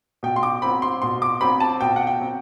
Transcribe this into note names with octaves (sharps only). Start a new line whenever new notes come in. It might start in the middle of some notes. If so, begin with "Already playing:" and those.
B2 G5
C6
D6
F#3 C4 B5
C6
B2 C6
D6
F#3 C4 B5
A5
B2 G5
F#5
G5
F#3 C4